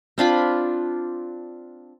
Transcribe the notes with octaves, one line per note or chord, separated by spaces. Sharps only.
C4 D4 F4 B5